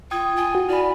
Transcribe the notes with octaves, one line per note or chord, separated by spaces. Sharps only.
F4 G5 D#6 G#6
F4 G#5
F#4
E4 D5 B5